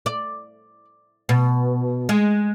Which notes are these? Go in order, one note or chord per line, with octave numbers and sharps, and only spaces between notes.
D5
B2
G#3